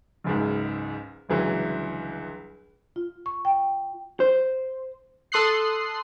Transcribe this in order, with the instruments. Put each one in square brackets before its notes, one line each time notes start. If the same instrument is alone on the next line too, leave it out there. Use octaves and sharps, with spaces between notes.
[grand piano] F#1 C#2 G#2
G1 C#2 E3 F#3
[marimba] F4
C#6
G5
[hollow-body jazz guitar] C5
[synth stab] A4 C6 D#6 F#6 C7